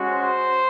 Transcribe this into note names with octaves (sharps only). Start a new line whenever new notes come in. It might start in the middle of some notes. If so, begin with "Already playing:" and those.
Already playing: G#3 C#4 F#4
C5